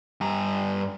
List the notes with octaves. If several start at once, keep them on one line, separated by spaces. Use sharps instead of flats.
G2 A#5